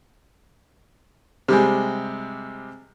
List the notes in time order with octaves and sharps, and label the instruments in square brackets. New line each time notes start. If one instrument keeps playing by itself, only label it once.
[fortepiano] C3 G3 G#3